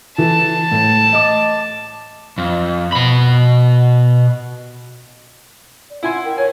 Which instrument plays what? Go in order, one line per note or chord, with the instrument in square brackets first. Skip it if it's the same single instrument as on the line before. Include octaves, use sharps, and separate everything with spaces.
[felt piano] E3 A4 [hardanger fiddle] A5
[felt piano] A2
D#5 D6
[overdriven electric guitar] F2
B2 B5
[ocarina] D5
[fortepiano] E4 G#5 C6 [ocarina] F#5
[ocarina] A#4 [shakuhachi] G5
[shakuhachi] C#5 [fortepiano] G#5